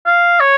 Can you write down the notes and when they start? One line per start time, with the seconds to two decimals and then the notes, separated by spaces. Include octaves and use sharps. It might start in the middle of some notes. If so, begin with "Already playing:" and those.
0.06 F5
0.40 C#5